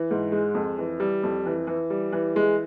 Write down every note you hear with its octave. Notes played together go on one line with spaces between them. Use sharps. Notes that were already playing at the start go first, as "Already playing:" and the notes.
Already playing: E3
G#2
G#3
F2
E3
G3
F2
E3
E3
G3
E3
G#3